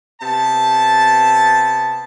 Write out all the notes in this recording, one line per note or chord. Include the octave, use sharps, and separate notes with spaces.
C3 B3 A5